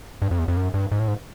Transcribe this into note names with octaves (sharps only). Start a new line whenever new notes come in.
G2
F2
E2
F2
F#2
G2
G#2
A2
G#2